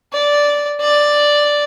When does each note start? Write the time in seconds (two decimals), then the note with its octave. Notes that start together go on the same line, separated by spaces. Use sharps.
0.13 D5
0.80 D5